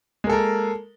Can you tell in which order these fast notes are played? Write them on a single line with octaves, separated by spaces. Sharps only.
G#3 A#3 A4 A#4